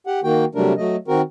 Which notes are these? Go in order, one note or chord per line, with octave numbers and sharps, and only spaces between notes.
G4 F#5
D#3 A#3 F#4 G5
C3 F#3 G3 A3 D4 A#4
F#3 A3 D#5
D#3 C4 F#4 A#4